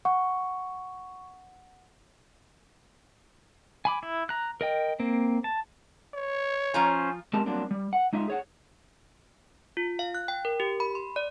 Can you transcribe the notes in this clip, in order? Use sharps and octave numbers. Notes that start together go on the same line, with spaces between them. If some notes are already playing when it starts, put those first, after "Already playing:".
F#5 C#6
G#5 B5 D6
E4
A#5 F#6
A#4 D#5 G5
A#3 C4
A5
C#5
F3 C#4 F4 C5 A#5
G#3 C4 G4 A#4 A5
F#3 G3 A#3 C4 D4
G3
F#5
G#3 D#4 F4 E5
G#4 C#5 F#5
F4
F5
F#6
G5
A#4
G4
B5
C6
D5